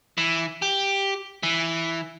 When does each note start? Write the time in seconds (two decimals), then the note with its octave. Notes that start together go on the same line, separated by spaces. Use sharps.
0.18 E3
0.62 G4
1.43 E3